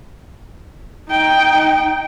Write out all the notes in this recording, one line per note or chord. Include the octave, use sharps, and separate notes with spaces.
D#4 G5